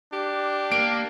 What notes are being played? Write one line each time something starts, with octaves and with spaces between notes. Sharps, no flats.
D4 G4
A#3 D7